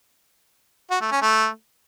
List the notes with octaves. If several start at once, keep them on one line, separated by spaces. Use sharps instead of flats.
F#4
A3
C#4
A3